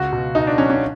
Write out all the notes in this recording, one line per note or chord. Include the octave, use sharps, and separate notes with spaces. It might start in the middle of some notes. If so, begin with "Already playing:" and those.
Already playing: C#2 F#4
B2
B2 D#4
D4
F#3 C#4
C#4